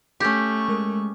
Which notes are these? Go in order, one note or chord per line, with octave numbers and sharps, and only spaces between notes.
A3 C#4 G4 C#6
G#3 A#4 D#6